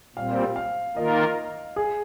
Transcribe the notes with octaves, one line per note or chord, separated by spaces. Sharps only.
A#2 G3 C4 F5
F5
D#3 A#3 F4 A#4 D#5
G#4